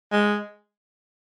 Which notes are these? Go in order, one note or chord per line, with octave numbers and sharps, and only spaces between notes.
G#3